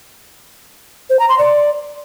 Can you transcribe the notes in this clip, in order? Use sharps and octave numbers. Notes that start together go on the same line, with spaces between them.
C5
A#5
C6
D5